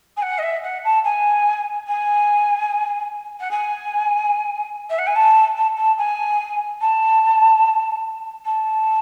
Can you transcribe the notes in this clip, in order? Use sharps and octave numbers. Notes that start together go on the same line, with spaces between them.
G#5
F#5
D#5
E5
F#5
A5
G#5
G#5
F#5
G#5
E5
F#5
G#5
A5
A5
A5
G#5
A5
A5